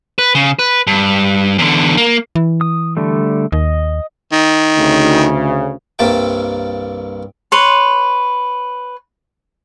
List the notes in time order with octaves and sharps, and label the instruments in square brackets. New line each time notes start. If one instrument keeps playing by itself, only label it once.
[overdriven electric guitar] B4
C#3
B4
G2
E2 D3
A#3
[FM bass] E3
[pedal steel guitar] D#6
D3 G3 A3
[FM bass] D#2 [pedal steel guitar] D#5
[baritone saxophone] D#3
[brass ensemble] D2 C#3
[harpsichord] C2 G2 A#3 A4 E5 G5
[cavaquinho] B4 C#5 C6